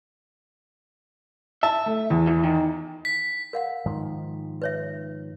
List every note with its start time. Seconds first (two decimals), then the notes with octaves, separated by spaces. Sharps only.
1.63 E5 A5
1.86 A3
2.10 E2
2.27 E3
2.43 D#3
3.05 B6
3.53 A#4 F5 F#5
3.86 G#2 D#3 F3
4.62 B4 C#5 E5